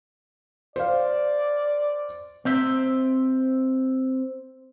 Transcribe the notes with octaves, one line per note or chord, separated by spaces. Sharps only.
C5 D5 F5
C4 C5 E5